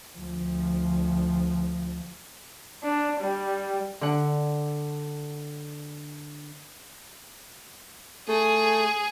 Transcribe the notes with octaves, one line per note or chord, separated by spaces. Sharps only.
D2 F3
D4
G3
D3 F#5
A3 G#4